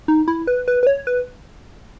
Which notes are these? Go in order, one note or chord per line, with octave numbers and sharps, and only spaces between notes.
D#4
E4
B4
B4
B4
C#5
B4